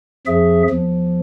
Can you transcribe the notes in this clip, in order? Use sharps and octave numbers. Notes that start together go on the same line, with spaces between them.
F2 F3 G#4 E5
E2 F3